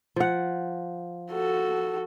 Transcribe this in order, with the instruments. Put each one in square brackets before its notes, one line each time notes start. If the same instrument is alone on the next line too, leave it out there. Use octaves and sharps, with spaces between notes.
[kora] F3 F#5
[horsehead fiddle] F#4 A4